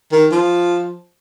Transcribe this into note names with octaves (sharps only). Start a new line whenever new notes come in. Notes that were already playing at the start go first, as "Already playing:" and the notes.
D#3
F3